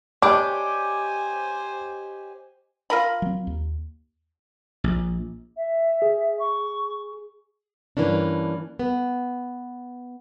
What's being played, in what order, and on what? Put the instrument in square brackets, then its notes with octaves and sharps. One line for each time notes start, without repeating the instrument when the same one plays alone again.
[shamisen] D4 [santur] G4 C#5 D#5 [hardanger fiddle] C5 G#5 [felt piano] D6
[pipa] F4 A#4 B5
[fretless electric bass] F#3 C4
D#2
[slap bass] A#1
[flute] E5
[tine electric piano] G#4
[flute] C#6
[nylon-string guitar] G2 A#2 E3 A#3 C#4 D4
B3